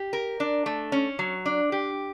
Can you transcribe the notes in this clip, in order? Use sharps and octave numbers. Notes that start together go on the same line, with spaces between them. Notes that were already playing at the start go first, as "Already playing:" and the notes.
Already playing: G4
A#4
D4
A3
C#4
F#3
D4
G4